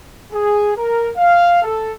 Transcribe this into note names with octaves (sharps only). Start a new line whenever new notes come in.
G#4
A#4
F5
A4